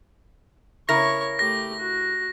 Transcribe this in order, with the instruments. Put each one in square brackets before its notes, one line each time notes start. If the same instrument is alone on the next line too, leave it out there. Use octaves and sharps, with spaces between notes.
[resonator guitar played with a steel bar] C#3 E4 A#4 [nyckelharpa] C#5 C#6 [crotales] A#6
[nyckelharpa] A3 G4 [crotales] A#6
[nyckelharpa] F#4